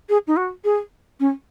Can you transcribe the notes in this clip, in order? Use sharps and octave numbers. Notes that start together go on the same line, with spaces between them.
G#4
D#4
F#4
G#4
C#4